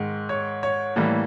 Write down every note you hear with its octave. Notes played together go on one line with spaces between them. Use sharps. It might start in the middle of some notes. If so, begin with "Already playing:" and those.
Already playing: G#2 D#3 G#3
C#5
C#5
A2 E3 G3 A#3